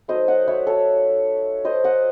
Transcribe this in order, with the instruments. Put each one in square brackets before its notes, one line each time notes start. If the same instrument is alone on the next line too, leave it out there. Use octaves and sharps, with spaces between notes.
[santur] F#3 A3 D#4 C5 D#5
D#5 F#5
C#5 E5
A4 C#5
C5 D#5
D#5 F#5